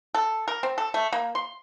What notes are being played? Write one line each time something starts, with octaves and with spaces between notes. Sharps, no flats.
A4
A#4
C4
A4
A3
A#3
C6